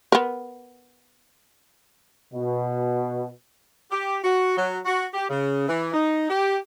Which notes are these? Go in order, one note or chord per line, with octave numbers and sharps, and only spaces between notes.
B3 A#4
B2
G4
F#4
F#3
F#4
G4
C#3
E3
D#4
G4